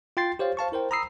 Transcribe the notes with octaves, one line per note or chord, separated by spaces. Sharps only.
F4 G5 C6 A6 C7
G4 C5 C#5 F5
C5 F5 A5 C#6
E4 A#4 C5 G5
A#5 B5 D#6 E6 C7